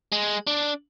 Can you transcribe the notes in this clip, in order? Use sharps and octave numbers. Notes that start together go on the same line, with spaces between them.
G#3
D4